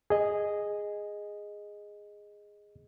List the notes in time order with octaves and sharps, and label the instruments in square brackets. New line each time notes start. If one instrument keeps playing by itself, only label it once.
[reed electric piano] G#4 D#5